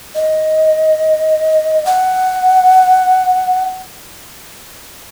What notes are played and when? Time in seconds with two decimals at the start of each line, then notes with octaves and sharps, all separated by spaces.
0.15 D#5
1.86 F#5